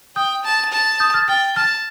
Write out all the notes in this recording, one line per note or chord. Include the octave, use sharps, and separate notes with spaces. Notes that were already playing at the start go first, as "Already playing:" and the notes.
G5 D#6 G6
A5
A5
D#6 G6
F6 A6
G5 F6 A6
A5 F6 A6